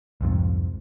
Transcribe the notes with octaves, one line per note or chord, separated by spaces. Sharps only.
C2 F2 G#2